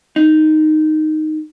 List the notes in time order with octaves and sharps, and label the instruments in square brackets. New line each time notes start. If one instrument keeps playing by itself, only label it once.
[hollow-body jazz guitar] D#4